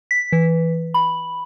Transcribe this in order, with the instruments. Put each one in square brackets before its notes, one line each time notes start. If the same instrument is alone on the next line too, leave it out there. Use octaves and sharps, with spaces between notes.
[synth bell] B6
E3
B5